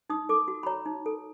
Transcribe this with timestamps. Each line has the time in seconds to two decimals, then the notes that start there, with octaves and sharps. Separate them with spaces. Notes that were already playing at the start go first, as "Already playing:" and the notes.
0.10 D#4 D#6
0.29 A4 D6
0.48 F#4
0.63 B5
0.66 C#5 A#5
0.86 D#4
1.06 A4